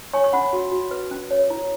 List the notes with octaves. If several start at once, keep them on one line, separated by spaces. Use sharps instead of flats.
C#5 G#5 C#6
C#6
C#4 F#5 B5
F#4
F#4
B4
C#4
C#5
E4